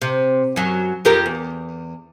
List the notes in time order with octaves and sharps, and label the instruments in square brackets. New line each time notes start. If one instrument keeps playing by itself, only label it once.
[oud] C3
F#2 F#3
F2 G4 A#4
E2